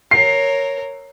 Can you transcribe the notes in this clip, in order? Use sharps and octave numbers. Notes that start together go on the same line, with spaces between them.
A#4 C#5 C7